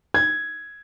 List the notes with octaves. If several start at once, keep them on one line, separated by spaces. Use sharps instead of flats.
G#6